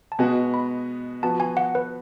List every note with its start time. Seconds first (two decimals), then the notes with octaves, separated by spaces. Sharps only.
0.12 A5
0.19 B2 G#3 B3 F#4 G#5
0.54 B5
1.23 F3 B3 F#4 B4 A5
1.40 G#5
1.57 F#5
1.75 B4